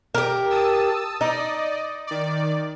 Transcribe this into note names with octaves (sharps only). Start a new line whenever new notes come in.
G4 A#4
A5 D#6 E6
D#4 D5 D#5
D#3 D5